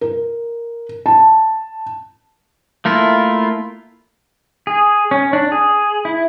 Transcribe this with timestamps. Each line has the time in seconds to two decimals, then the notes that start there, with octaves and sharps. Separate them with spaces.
0.01 A#4
1.06 A5
2.85 A3 A#3 E4 F4
4.67 G#4
5.11 C#4
5.33 D4
5.52 G#4
6.05 E4